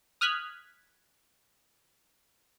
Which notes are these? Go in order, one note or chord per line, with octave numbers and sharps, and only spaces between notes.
D#6 F6 F#6 G#6 B6